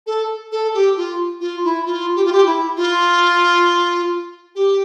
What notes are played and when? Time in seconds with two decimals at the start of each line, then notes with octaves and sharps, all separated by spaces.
0.06 A4
0.52 A4
0.74 G4
0.96 F4
1.40 F4
1.64 E4
1.85 F4
2.15 G4
2.25 F4
2.32 G4
2.46 E4
2.76 F4
4.55 G4